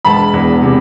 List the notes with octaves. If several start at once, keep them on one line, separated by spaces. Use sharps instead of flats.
E1 A5 B5
E2
C3